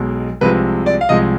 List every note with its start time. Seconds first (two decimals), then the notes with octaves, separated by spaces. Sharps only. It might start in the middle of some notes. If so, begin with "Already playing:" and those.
Already playing: B1 B2 G#3
0.41 C2 C3 F3 G#3 B4
0.86 D5
1.01 F5
1.09 C2 C3 F3 G#3 D#5